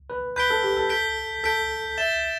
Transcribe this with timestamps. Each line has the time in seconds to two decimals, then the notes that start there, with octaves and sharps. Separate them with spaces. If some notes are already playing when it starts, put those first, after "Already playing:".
0.10 B4
0.36 B4 G6 B6 D7 G7
0.50 A4
0.63 G4
0.77 A4
0.90 G6 B6 D7 G7
1.44 A4 G6 B6 D7 G7
1.97 E5 A6 E7 G7